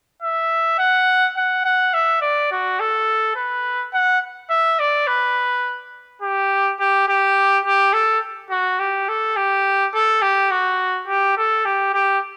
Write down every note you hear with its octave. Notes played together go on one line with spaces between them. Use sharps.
E5
F#5
F#5
F#5
E5
D5
F#4
A4
B4
F#5
E5
D5
B4
G4
G4
G4
G4
A4
F#4
G4
A4
G4
A4
G4
F#4
G4
A4
G4
G4